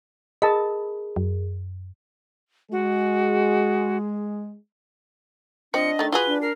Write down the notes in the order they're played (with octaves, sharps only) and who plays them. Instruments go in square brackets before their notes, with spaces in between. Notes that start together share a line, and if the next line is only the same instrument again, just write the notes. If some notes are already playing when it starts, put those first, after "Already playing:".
[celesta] G#4 A#4 [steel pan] D#5 A5 [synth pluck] B5
[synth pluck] F#2
[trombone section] G#3 G#4 [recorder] F#4
[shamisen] F3 C4 [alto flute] D4 [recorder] D#5 [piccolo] C#7
[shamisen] D#3 A3 [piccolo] A6
[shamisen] F4 F#4 G#4 [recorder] B4 [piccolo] G7
[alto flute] D4
[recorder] A#4 [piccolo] C7